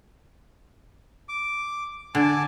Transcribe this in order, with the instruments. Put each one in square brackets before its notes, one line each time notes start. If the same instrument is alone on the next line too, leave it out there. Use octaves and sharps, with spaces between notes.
[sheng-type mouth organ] D6
[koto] D3 [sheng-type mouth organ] G#5 A5 D6